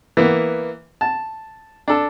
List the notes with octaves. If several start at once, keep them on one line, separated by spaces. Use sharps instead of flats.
E3 A#3 B3
A5
D4 A4